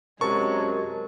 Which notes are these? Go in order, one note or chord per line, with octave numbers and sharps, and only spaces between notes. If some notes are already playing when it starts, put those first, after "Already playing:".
F#2 C3 F#3 G#3 A#4 C5 A5 C#6